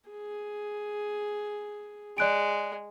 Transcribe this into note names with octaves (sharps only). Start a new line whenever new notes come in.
G#4
G#3 D5 F#6 D7